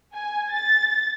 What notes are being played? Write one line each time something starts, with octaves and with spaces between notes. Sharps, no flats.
G#5
A6